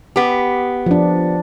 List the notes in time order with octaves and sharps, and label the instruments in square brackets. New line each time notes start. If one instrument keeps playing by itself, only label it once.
[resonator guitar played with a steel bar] B3 G4
[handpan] F3 D4